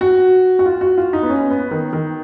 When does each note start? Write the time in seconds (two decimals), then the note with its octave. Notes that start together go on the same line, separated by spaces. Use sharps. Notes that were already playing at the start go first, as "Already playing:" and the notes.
0.01 F#4
0.59 F#4
0.66 F4
0.81 F#4
0.98 F4
1.13 D#4
1.23 B3
1.30 C#4
1.51 B3
1.71 D#3
1.93 D#3